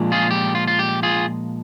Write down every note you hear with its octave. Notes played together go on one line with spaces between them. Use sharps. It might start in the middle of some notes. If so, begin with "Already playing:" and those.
Already playing: A#2 F3 G#3 D4
F4 G#4
G4
F4
F4
G4
F4 G#4